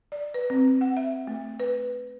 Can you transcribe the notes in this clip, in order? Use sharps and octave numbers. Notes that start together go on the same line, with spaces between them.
D5
B4
C4
F#5
E5
A3
B4